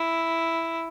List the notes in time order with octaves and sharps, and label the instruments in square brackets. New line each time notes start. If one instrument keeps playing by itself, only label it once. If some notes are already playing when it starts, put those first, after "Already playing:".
Already playing: [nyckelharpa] E4